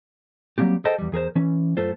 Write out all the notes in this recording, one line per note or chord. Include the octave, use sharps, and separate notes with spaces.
F#3 G3 A#3 C4 G4
G#4 A4 C5 D#5 G5 A5
E2 G3
E2 G#4 A#4 C5
E3 C#4
F#2 A3 F4 A4 C5